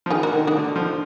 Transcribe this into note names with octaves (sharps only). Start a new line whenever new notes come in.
F3
D#3 F4 G#4
D3 F#4 A#4
D#3
D#3 D#4 F#4
D3
F3